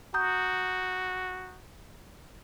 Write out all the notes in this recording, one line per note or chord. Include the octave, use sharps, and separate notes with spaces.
F#4 A#5 D#6 G6